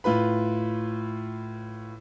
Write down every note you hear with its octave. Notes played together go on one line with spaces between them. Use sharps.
A2 F4 B4 B5